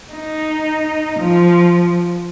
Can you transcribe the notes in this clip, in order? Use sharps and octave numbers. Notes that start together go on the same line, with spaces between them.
D#4
F3